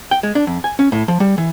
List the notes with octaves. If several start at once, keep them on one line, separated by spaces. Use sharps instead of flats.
G5
G#3
D4
F2
G#5
C#4
A2
F3
G3
E3